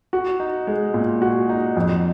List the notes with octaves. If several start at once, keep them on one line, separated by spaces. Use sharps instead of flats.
F#4
D#4
G#3
A#2
F#4
D#4
F2